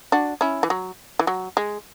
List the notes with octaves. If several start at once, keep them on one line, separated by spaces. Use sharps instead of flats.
D4 F#4
C#4 E4
E3
F#3
E3
F#3
G#3